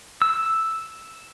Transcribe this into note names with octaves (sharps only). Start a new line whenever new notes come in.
E6